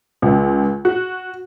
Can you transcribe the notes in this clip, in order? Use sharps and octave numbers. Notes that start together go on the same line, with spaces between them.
C#2
F#4